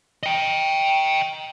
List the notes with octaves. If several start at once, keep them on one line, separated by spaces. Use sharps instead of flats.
D#5 G5